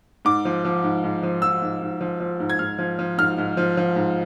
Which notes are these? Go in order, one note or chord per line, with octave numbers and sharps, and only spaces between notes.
G#2 D6
F3
F3
G#2
G#2
F3
F3 E6
G#2
G#2
F3
F3
G#2
G#6
G#2 F6
F3
F3
G#2 F6
G#2
F3
F3
G#2